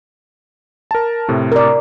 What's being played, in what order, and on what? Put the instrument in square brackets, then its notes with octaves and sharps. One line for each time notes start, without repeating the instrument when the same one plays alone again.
[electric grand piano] A#4 A5
A2 C3 A3
[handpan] A#4 D5